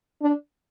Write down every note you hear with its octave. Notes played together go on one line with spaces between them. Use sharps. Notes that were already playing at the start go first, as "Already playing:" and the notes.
D4